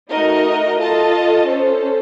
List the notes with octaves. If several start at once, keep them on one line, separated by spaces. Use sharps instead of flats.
A3 D#4 F#4 A#4 D#5
F4 A4 D#5 A5
C#4 A4 C5